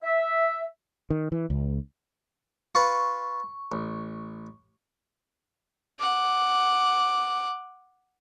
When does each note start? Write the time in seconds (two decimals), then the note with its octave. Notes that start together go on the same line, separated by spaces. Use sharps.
0.02 E5
1.10 D#3
1.32 E3
1.50 C#2
2.75 F4 B4 C#6
3.72 A1
5.99 F#5 D6